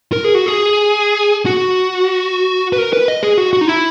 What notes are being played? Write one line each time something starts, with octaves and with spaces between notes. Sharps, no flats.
A#4
G#4
F#4
G#4
F#4
B4
A#4
B4
D#5
G#4
F#4
F#4
D#4
E4